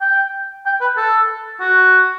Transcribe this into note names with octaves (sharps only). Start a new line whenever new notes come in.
G5
G5
B4
A4
F#4